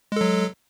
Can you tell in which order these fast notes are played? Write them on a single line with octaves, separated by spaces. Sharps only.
G#3 A4 F#3